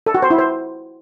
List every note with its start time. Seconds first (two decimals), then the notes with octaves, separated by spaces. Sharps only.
0.06 A4
0.14 F#4
0.22 C5
0.31 E4
0.39 C5